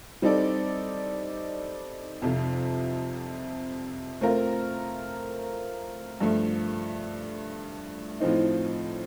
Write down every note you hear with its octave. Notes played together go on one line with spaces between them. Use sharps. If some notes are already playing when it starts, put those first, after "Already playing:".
G3 C4 D#4 A4 D5
F2 C3 F3
A3 C4 F4 A#4
G2 F3 A3
A2 F3 C4 D#4